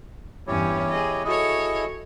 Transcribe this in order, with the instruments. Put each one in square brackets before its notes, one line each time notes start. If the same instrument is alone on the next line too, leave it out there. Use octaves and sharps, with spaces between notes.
[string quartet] E2 G2 C#4 [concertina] E4 G4 C#5
[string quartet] G#4 D#5
[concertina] E4 G#4 D#5 [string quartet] F#4 A4 C#5